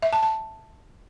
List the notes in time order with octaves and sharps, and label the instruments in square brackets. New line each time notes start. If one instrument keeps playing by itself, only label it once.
[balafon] E5
A5
A5